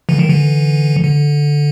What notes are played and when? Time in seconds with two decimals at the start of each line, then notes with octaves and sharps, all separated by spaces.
0.09 D3 E3
0.19 D#3
0.29 D3 E3
1.04 D3